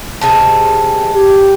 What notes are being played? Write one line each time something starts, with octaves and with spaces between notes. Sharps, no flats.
C3 D#3 G#4 A5
G4